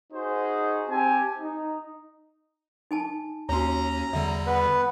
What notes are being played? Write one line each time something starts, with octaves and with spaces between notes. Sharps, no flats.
D#4 F#4 G#4 C5
C4 G4 G#5 A5
D#4
D#4 G#5 A5
D#2 C#4 F#4 C#5 A#5
E2 D3 G3 E5
B3 B4